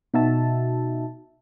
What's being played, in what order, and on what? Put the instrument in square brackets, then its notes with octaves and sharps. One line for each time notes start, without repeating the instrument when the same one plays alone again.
[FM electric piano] B2 D#4 F#4 E5 A5